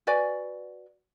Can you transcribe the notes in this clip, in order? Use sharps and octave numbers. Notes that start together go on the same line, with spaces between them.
F#4 B4 D5 G#5